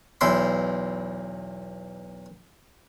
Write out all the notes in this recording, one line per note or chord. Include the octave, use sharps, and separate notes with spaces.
B1 E2 E4 C6